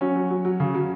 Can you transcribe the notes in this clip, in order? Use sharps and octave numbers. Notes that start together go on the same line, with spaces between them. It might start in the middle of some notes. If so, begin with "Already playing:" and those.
F#3 C#4
F#3
F#3
F#3
C#3
F#3